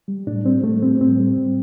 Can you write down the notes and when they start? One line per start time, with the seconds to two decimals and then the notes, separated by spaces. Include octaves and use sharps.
0.08 G3
0.27 A2 D4
0.45 G3 C4
0.64 A2 A3
0.82 G3 C4
1.01 A2 C4
1.19 G3
1.37 A2